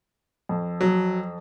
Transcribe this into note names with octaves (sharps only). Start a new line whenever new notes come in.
F2
F#3